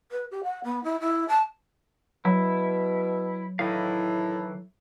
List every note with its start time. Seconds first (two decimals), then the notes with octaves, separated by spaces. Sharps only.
0.12 B4
0.31 G4
0.44 F#5
0.64 B3
0.84 E4
1.00 E4
1.28 A5
2.25 B2 F#3 E4
3.59 A2 D#3 E3 F5